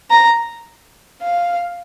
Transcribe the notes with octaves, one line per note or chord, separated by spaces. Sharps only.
A#5
F5